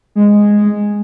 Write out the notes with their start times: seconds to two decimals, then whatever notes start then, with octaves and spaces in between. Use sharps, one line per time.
0.16 G#3